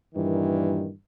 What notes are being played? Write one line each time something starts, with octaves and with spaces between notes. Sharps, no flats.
G2 A#2 D#3 E3